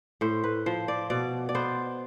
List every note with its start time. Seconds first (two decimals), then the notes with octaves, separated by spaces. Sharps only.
0.21 A2 C5
0.44 B4
0.66 F3 C5
0.88 D5
1.10 B2 D5
1.49 D5
1.55 B3 C5